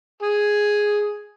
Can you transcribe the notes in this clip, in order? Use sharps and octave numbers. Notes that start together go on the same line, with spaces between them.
G#4